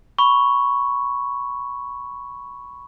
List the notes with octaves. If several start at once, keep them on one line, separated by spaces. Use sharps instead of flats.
B5 C#6